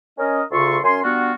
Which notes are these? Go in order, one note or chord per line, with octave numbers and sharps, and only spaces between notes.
C#4 A#4 D#5
D2 C#3 F4 A4 C6 C#6
F#2 C#4 G#5 C6
G3 B3 D4 F4 F#4